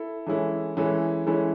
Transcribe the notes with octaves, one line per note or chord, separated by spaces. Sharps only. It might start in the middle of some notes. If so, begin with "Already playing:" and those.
Already playing: E4 A4
E3 G#3 C#4 E4 A4
E3 G#3 C#4 E4 A4
E3 G#3 C#4 E4 A4